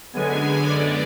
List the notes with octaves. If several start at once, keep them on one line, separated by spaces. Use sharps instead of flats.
F#2 D3 G#3 B3 G#5
D5